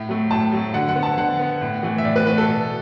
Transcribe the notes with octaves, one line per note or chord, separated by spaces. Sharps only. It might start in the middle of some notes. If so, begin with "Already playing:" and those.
Already playing: A2
F#3 A3
A2 A5
F#3 A3
D3 F#5
F#5
B3
A5
D3 F#5
B3
A2
E3 A3
E5
A2 D5
B4
E3 A3 B4
A4
B2